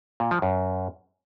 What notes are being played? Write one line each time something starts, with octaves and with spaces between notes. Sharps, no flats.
A#2
F3
F#2